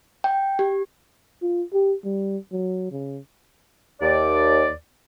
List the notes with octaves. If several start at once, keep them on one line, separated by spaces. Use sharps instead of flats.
G5
G4
F4
G4
G3
F#3
C#3
D#2 D5